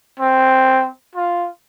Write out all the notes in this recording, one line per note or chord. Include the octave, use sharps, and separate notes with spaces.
C4
F4